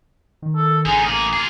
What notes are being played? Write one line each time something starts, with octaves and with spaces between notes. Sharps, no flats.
D#3
A4
A1 D3 D#4 G#4
A2 A#3 G#4
F4 G#4